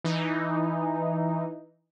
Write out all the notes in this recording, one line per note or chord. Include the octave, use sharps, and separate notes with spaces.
E3 D#4